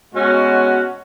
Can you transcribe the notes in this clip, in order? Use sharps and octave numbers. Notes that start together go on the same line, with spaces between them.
B2 G#3 C#4 F#4